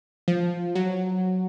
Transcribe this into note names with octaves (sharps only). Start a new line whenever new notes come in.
F3
F#3